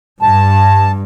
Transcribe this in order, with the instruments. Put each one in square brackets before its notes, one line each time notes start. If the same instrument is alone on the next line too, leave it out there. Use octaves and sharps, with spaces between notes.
[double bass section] G2 [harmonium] A5